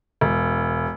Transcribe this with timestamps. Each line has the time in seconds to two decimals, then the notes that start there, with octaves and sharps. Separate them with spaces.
0.21 E1